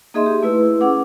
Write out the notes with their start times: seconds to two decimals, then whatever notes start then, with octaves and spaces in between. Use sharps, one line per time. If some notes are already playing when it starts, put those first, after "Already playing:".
0.14 A#3 D#4 G#4 D#5 E5 C6
0.26 G4
0.43 A3 E4 B4 E6
0.81 C#4 G#4 F#5 D6